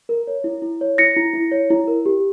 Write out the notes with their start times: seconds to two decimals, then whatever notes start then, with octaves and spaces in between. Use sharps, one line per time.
0.09 A#4
0.27 C#5
0.44 E4
0.62 E4
0.81 C#5
0.98 E4 A#6 C#7
1.16 E4
1.34 E4
1.52 C#5
1.70 E4
1.88 A#4
2.06 G4